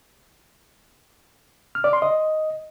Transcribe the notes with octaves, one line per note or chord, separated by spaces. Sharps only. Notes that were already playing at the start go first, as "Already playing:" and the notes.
F6
D5
C6
D#5